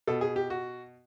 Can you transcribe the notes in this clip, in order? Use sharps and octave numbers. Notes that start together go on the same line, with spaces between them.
B2 A4
G#4
G4
F#4